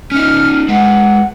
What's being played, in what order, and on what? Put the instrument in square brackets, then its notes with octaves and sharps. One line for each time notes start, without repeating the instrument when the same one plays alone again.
[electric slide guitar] C#4 D#4 [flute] F6
[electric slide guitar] G#3 B4 [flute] F#5